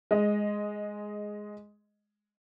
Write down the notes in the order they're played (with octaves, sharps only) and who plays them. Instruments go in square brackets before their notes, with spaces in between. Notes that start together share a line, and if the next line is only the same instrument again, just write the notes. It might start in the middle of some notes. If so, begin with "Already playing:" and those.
[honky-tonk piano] G#3 D#5